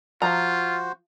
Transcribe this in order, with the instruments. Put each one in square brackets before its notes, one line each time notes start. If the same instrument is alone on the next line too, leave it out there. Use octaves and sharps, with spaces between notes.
[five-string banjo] F3 A#5 [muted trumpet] F4 [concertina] F#4 C5